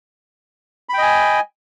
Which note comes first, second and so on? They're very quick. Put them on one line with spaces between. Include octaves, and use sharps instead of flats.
B5 G5 D#5 G#5